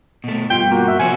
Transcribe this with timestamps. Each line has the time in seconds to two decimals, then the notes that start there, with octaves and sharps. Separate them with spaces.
0.24 B2 A3
0.51 G2 B2 F4 G5
0.71 A#3 F#4
0.88 E5
0.99 C3 F3 C#4 F#4 G#5